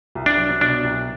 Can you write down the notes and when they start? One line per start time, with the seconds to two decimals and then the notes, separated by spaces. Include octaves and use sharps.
0.15 C2
0.26 D4
0.37 F#3
0.61 B2 D4
0.84 C2